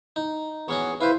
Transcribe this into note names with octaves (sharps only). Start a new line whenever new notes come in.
D#4
E3 B3 C#4 F#4 G#4 C#6
E4 B4 C5 F5